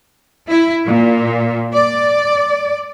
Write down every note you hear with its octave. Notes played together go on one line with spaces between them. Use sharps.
E4
A#2
D5